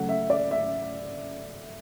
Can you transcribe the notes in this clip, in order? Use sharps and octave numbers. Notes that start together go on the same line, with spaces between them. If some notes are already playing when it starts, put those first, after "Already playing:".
Already playing: C#3 F#3 A3 F#5
E5
D5
E5